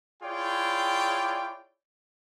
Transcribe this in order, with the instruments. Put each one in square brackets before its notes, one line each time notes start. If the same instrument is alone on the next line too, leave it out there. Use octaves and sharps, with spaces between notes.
[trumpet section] E4 F4 G#4 C#5 D5 G5